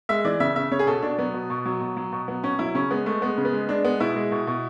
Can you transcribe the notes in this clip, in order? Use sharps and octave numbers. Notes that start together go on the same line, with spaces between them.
G#3 E5
E3 D5
C#3 E5
C#3 E5
C#3 C#5
G#4
B2 A4
B2 D4
F#3 B3
B2
B2
F#3
B2
F#3
B2
F#3 B3
B2 C#4
F#3 E4
C#3 C#4
G#3 B3
G#3 A3
G#3 B3
C#3
B3
G#3
G#3 D4
G#3 B3
B2 E4
G#3
B2
B2